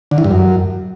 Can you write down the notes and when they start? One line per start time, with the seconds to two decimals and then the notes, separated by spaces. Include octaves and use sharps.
0.11 D3
0.18 E3
0.24 G2
0.31 F#2